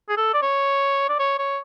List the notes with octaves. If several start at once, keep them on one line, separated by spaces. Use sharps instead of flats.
G#4
A4
D5
C#5
D5
C#5
C#5